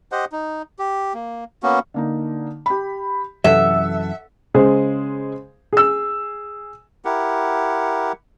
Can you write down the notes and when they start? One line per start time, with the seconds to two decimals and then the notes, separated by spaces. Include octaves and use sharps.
0.12 G4 C5 D#5 F#5
0.32 D#4
0.79 G4
1.14 A#3
1.63 A#3 B3 C#4 F#4
1.94 D3 A#3 D#4
2.66 G4 B5
3.44 F#2 C3 E3 A4 E5 F#5
4.54 C#3 G#3 G#4 C5
5.73 G#4 E6
7.05 E4 G4 A#4 F#5